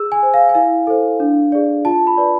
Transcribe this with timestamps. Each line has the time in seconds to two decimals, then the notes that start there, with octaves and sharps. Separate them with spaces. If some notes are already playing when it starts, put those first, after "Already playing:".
Already playing: G#4 E6
0.12 G#5
0.23 C5
0.34 F5
0.49 G#5
0.55 E4 F5
0.87 A4 C5
1.20 D4
1.52 G#4 D5
1.85 F4 A5
2.07 B5
2.17 B4 D5